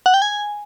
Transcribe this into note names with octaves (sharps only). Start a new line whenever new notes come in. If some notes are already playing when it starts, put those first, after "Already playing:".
F#5
G5
G#5